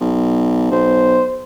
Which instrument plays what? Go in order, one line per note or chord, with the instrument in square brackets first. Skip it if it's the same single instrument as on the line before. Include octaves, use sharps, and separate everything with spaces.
[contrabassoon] B1
[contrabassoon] B1 [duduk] C5